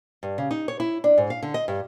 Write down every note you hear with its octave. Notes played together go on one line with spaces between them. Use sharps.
G2
C#3
D#4
C#5
E4
D4
G#2
F5
D3
D#5
G2